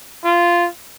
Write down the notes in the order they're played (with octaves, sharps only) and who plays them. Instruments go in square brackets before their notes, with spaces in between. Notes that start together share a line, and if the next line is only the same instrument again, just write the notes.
[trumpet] F4